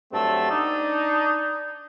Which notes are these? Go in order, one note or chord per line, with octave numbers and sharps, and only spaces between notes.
G2 F#3 A3 C4 A5 E6
D4 D#4